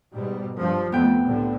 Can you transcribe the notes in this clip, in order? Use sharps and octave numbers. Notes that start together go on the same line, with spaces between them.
G#2 B2 G3
G2 F3
F2 A3 B3 G5
C2 A2 D3